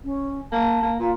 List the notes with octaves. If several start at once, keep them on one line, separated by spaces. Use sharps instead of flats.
C#4
A#3 A5
A#3
A#2 F4